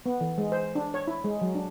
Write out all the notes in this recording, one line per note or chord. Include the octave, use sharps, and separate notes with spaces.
B3
E3
G#3
C5
D4
C#5
E4
G#3
F#3
D4